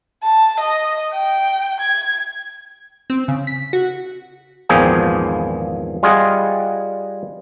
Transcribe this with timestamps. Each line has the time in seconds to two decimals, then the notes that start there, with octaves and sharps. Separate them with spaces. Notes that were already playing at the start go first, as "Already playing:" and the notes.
0.23 A5
0.60 D#5
1.14 G5
1.80 G#6
3.10 C4
3.28 C#3
3.47 B6
3.73 F#4
4.69 G#1 E2 A#2 F3 G#4 G5
6.03 G3 F4 G#4 D#5 F#5